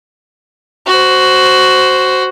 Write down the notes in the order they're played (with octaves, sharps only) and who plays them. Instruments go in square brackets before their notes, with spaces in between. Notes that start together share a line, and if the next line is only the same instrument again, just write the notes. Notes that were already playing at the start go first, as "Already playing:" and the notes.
[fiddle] F#4 C5